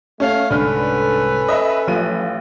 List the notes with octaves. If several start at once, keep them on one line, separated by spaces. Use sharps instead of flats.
A3 C#4 F5
C2 G#2 D3 G3 C#4 A4 B4 F6
D#5 E5 B5
A1 F3 F#3 F4 D#7